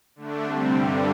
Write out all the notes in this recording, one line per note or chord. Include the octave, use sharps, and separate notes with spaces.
D3 A3 D4
C3 G3 C4
G2 D3 G3